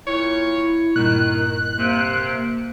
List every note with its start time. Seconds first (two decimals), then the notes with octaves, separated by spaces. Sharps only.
0.07 A#2 E4 C#5
0.96 G2 A#2 D#3 F#6
1.78 C3 A#3